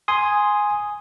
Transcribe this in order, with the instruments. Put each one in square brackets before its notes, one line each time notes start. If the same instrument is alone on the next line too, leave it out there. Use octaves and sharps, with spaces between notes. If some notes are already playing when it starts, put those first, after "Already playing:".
[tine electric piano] G#5 C6 D#6